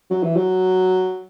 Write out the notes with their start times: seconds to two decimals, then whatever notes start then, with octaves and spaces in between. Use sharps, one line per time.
0.10 F#3
0.23 E3
0.36 F#3